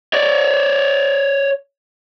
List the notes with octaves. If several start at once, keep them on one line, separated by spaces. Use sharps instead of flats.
C#5 D5